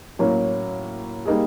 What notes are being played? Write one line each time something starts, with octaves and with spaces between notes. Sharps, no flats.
A2 F#3 A#3 C#4
G3 A#3 D#4 G#4